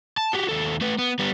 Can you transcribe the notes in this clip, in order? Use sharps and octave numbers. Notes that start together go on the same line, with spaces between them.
A5
F#4 G4
D#2 A4
A3 B4
B3
G3 B3